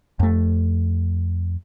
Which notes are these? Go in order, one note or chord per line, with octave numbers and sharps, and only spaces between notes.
F2 A3